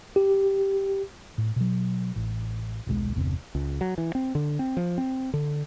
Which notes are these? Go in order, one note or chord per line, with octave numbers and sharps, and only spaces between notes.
G4
A2
B2 F#3
A1
D#1 B1 G#3
G1 E2 C3
C#2
F#3
E3
C4
D3
C4
F3
C4
D3